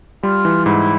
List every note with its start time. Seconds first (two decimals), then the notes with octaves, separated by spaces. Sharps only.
0.23 G3 F4
0.45 E3
0.66 G#2 E4